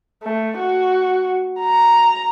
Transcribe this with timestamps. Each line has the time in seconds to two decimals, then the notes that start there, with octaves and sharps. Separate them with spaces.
0.23 A3
0.58 F#4
1.60 A#5